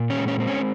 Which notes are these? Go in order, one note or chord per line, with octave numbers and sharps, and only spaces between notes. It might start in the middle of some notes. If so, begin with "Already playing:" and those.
Already playing: A#2
C#4
G#3
C#4
C4
C#4